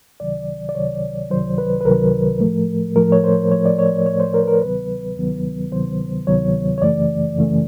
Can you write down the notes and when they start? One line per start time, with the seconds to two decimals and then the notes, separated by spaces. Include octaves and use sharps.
0.20 C#2 C3 D#3 F#3 D5
0.69 D5
0.75 C#2 C3 D#3 F#3 C#5
1.31 C#2 C3 D#3 F#3 C5
1.58 B4
1.81 B4
1.85 C#2 C3 D#3 F#3 A#4
2.40 A2 F3 A3
2.95 A2 F3 A3 A#4
3.12 C#5
3.24 C5
3.51 A2 F3 A3 C#5
3.66 D5
3.79 C#5
4.06 A2 F3 A3 C#5
4.20 C5
4.34 A#4
4.43 B4
4.47 A#4
4.62 D2 C3 D#3 F#3 B3 B4
5.16 D2 C3 D#3 F#3 B3
5.72 D2 C3 D#3 F#3 B3 C5
6.27 D2 C3 D#3 F#3 B3 C#5
6.78 C#5
6.82 F#2 C#3 E3 A3 D5
7.37 F#2 C#3 E3 A3